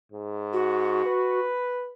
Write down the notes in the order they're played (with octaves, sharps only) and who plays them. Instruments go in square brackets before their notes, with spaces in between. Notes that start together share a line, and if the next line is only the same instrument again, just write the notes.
[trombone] G#2
[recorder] F#4
[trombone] B4